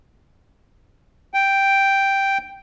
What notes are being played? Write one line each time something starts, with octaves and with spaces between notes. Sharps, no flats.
G5